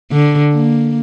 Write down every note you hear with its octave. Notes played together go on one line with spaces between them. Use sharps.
D3
A#3